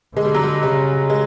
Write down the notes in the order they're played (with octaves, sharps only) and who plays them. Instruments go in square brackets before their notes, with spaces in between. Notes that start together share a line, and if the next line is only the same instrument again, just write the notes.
[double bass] D3 [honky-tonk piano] G#3
[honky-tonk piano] G3
F#3
G3
[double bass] C#3 [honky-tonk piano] G3
[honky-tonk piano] G#3